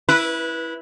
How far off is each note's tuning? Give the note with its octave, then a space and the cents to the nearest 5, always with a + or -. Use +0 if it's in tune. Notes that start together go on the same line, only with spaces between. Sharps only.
E4 +0 B4 -20